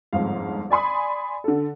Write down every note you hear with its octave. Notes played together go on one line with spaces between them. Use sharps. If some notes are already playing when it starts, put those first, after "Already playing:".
G1 F2 G#2 F5
D5 G#5 B5 C6 D#6
D3 A4